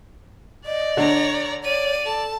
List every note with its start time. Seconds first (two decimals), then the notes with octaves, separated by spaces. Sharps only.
0.66 D5 D#5
0.97 D3 C#5 A#5
1.64 C#5 D5 D#7
2.05 A4 A5